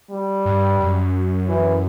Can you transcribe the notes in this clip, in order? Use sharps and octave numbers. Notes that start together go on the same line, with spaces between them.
G3
G2
F#2
E3